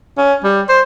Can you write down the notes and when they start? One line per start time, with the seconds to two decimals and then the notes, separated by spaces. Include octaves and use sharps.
0.17 C#4
0.44 G3
0.68 C5